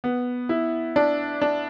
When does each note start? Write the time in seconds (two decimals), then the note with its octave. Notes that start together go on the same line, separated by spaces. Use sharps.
0.04 B3
0.49 E4
0.96 D4
1.42 D4